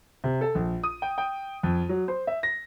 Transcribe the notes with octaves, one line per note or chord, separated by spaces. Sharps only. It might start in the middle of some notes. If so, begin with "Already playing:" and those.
C3
A4
A#1
D#6
G5
G5
F2
F#3
C5
E5
A#6